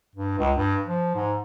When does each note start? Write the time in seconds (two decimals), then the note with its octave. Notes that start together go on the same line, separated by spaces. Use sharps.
0.16 G2
0.39 C#2
0.54 G2
0.86 F3
1.15 G#2